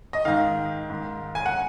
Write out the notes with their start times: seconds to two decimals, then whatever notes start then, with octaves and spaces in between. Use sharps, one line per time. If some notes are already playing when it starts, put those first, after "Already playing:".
0.13 D#5
0.25 G#2 D#3 F5
0.90 G#2 D#3
1.35 G#5
1.46 F#5